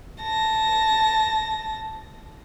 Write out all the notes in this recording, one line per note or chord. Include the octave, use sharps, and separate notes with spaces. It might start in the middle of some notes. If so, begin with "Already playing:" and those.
A5 A#6